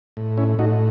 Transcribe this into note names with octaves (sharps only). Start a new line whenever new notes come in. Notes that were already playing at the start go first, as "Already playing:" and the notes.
A2
C#4 E4
A2 D#4 F#4